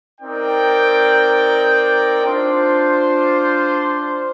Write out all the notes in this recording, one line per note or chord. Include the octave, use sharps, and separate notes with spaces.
C4 D#4 A#4 D5 G5
D4 F4 C5